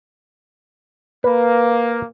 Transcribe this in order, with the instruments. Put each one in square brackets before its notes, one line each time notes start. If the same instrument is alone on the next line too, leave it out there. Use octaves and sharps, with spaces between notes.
[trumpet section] A#3 [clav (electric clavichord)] B4